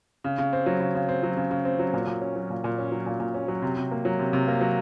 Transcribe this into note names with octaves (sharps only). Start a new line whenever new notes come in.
C#3
C#3
C4
F#3
C#3
C#3
C4
F#3
C#3
C#3
C4
F#3
A#2
A#2
C#4
F#3
A#2
A#2
C#4
F#3
A#2
A#2
C#4
F#3
C3
C3
A#3
F#3
C3
C3
A#3
F#3